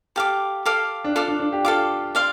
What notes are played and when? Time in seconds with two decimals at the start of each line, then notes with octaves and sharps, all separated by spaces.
0.16 G4 A4 F5 D6
0.66 A4 F5 D6
1.04 D4
1.15 F4 A4 F5 D6
1.28 D4
1.40 D4
1.52 G4
1.65 F4 A4 F5 D6
2.15 D5 F5 C6